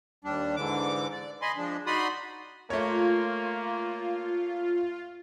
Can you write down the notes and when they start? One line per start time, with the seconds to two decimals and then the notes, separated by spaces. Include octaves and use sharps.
0.24 D#2 G3 D4
0.56 G#2 D3 E3 D6
1.12 D5
1.42 D#5 G#5 B5 C6
1.57 F3 G#3 D4
1.86 D#4 F#4 D5 B5 C6 D#6
2.70 A3 A#3 F4 C#5